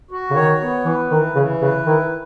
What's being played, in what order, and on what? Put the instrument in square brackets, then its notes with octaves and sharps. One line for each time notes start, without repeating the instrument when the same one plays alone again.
[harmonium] F#4
[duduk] C#3
[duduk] D#3 [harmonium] C#5
[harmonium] B3
[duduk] E3 [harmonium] B4
[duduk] D#3 [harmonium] E3
[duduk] C#3 [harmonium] E3
[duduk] C#3 [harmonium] B4
[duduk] D#3 [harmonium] E4